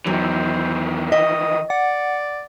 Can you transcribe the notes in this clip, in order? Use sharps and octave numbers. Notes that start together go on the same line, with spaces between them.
E2 D#3 E3 F#3 C5
D#5 E5 D#6
D5 F#5